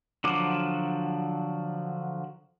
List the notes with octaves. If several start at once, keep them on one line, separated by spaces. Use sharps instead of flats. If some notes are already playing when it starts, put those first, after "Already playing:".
D3 F3 F#3 D6